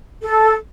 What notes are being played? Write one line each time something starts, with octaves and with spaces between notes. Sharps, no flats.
A4